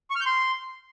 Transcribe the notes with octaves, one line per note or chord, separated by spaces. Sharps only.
C#6
F6
G6
C6